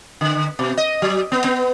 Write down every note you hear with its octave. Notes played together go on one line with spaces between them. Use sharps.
D3
B2
D#5
F#3
B3
B3